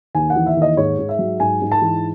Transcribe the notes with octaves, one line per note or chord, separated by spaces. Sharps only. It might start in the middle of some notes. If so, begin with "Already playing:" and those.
D#2 G#5
F#5
E3
E5
D#2
D#5
G#2 C#5
G#2
E5
F#3
G#2 G#5
G#2
A5
E3